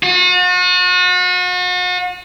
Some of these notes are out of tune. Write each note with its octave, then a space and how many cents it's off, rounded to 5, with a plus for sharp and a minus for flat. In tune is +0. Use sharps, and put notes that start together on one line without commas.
F#4 -40